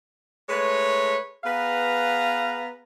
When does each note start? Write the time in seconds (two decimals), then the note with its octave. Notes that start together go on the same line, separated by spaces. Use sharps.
0.49 G#3 A3 B4 C#5
1.44 B3 G#4 B4 F5 A#5